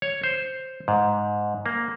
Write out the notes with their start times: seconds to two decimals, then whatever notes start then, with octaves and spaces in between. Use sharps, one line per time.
0.02 C#5
0.23 C5
0.88 G#2
1.66 A#3